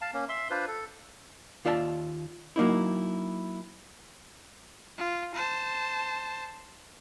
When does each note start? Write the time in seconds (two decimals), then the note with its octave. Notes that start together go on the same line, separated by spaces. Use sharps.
0.01 F5 A5
0.14 A#3 C#4
0.29 E5 C6
0.50 D4 F4 B4 C5
0.68 A4
1.65 D#2 F4 D5 E5 F5 A5
2.56 F#3 A#3 D#4 E4
4.98 F4
5.34 C5 A5